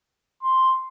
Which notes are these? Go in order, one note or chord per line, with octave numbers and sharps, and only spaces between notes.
C6